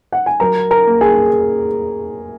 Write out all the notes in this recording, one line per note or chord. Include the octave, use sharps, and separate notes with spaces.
F#5
G#5
F#3 A#4 A#5
A#4 A#5
A#3
G#4 G#5